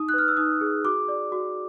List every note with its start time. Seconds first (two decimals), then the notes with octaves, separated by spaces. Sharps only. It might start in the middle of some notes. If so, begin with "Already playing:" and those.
Already playing: D#4 D#6
0.09 F#6
0.14 B4 F6
0.28 E6
0.37 D#4 D#6
0.61 G#4
0.85 F#4 D6
1.08 D5
1.32 F#4